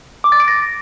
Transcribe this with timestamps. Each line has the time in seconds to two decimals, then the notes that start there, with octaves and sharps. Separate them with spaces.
0.24 D6
0.32 A6
0.40 D7
0.48 A#6